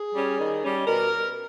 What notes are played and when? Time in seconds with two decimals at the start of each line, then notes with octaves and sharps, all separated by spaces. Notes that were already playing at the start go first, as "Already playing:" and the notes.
Already playing: G#4
0.15 G3 C#4
0.40 D#3
0.63 G3 C#4
0.86 B2 A#4